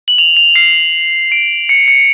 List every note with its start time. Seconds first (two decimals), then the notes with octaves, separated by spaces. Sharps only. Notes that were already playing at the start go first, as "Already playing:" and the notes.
0.08 F#7
0.18 F7
0.37 F7
0.56 C7
1.32 D7
1.69 C#7
1.88 C#7